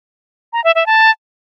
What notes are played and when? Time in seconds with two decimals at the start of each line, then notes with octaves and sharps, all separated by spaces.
0.53 A#5
0.64 E5
0.75 E5
0.86 A5